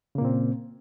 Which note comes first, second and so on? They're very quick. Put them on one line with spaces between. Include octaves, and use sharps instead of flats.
C#3 A#3 A#2 C4